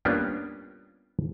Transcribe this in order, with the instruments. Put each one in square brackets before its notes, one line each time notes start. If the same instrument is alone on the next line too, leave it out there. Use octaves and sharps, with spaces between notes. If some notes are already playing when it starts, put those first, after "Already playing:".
[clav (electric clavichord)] G3 A#3 B3 C#4 D4 F4